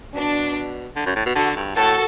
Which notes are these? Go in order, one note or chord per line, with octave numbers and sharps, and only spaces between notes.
B2 D4
D3
F#2
A2
B2
D3 F#4 A4
G2
A2 F#4 A4